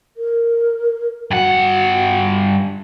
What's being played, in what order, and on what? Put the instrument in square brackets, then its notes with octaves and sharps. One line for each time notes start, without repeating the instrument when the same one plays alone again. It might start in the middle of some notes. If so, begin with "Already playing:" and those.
[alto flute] A#4
[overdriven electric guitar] G2 F#5 [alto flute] F#4